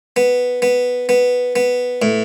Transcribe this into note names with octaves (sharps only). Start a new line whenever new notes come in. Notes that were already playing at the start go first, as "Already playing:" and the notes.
B3
B3
B3
B3
A2